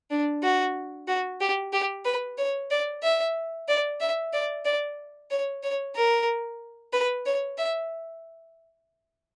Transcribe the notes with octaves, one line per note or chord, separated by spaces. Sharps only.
D4
F#4
F#4
G4
G4
B4
C#5
D5
E5
D5
E5
D5
D5
C#5
C#5
A#4
B4
C#5
E5